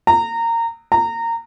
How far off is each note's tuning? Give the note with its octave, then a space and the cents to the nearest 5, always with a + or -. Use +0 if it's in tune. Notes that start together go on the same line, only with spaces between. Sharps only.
A#5 -20
A#5 -20